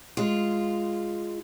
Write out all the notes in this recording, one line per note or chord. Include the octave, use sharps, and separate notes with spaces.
G#3 F4